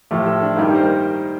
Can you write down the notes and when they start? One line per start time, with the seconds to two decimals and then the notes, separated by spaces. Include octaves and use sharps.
0.11 A2 F3 A3 G4
0.26 A4
0.42 D4
0.57 G2 D#3 G3 A#3 D#4
0.75 C5
0.80 A#4